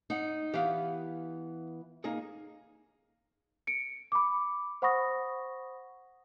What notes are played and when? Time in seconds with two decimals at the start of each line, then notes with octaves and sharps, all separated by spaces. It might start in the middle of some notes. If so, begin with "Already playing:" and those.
0.10 D#4 F#5
0.54 E3 B3 G4 F5
2.04 A#3 D#4 G#4
3.67 C#7 D7
4.12 B5 D6
4.82 C5 F#5 B5 C#6 D#6 A#6